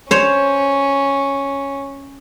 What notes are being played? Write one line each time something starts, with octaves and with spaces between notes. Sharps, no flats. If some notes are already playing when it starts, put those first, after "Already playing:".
C#4 C5 C#5